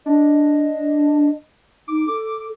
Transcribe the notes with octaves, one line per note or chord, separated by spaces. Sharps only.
D4 D#5
D#4 D6
A4 D6